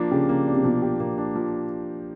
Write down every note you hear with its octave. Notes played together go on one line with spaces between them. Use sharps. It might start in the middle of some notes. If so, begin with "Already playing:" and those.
Already playing: F3 A#3 D4
C#3 G4
C#3 A#3
D4
C3
B2 F3
G4
A#2 A#3
D4
F3